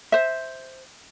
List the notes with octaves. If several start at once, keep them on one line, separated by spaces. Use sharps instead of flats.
C5 E5